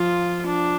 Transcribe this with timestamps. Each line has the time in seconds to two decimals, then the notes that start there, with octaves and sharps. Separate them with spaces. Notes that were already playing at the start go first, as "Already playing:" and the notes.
Already playing: F3 F4
0.46 D4